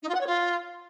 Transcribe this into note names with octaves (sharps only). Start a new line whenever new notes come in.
D#4
F4
F#5
C#5
F4